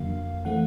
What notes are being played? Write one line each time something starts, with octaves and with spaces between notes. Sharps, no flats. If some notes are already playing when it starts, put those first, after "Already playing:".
Already playing: F2 D3 F#3 A#3 F5
E3 A3 C4 F#5